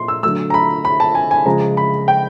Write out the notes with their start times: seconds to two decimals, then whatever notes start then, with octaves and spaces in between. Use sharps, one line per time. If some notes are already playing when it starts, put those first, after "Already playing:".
Already playing: A#2 C6
0.08 E6
0.23 D3 F#3 A3 E6
0.50 A#5
0.54 B5
0.85 B5
1.00 A5
1.15 G#5
1.31 G#5
1.46 C#3 F3 G#3 A#5
1.77 B5
2.08 G5